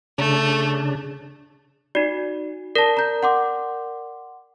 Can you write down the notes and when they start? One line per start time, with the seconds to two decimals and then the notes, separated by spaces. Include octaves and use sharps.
0.18 C#3 A3 D4
1.95 D#4 F#4 D5
2.75 A#4 D5 A5 A#6
2.97 A#5 G6
3.23 F#5 C6 D6